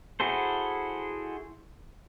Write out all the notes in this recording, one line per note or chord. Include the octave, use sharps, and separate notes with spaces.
E4 F#4 G#4 A4 C5